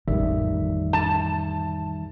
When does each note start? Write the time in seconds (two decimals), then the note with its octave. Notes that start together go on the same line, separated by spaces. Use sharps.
0.08 A1 F2 D#3 G3 E5
0.93 A5